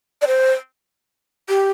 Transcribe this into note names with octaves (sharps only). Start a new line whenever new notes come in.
D5
C5
G4